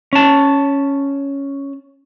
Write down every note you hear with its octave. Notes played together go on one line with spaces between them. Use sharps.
C#4 A5